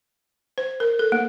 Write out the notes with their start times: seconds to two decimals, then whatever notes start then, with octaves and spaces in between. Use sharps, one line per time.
0.58 C5
0.80 A#4
0.99 A4
1.12 A#3